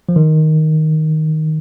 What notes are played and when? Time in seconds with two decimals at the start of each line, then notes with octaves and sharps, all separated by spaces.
0.09 F3
0.16 D#3